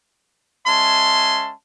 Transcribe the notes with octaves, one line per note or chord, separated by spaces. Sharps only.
G#3 C#4 E5 A5 C6